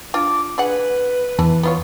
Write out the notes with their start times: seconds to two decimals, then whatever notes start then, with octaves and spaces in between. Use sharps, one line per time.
0.14 D4 F4 D6
0.58 D4 G#4 B4 F#5
1.39 E2 E3 A5
1.63 B3 F4 C#5